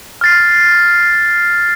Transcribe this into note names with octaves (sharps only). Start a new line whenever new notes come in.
F6 A6 C7